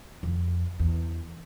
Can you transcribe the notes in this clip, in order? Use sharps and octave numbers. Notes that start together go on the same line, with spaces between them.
F2
E2